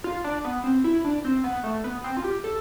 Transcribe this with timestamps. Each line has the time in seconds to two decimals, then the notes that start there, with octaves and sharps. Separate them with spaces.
0.04 F4
0.24 D4
0.45 B3
0.64 C4
0.84 E4
1.04 D4
1.25 C4
1.44 B3
1.64 A3
1.84 B3
2.04 C4
2.17 F4
2.24 G4
2.44 A4